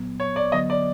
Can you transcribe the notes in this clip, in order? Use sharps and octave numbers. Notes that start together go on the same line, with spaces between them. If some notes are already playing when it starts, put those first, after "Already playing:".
Already playing: A#2 F#3 B3
C#5
D5
D3 F#3 B3 D#5
D5